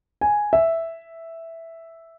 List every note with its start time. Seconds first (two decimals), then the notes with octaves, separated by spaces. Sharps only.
0.21 G#5
0.53 E5